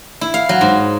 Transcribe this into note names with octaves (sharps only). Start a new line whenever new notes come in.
E4
F5
F#3
G#2